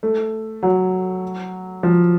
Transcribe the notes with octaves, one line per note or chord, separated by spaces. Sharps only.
A3
F#3
F3